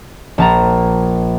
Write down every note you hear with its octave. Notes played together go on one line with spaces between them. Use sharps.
A#1 A5 A#5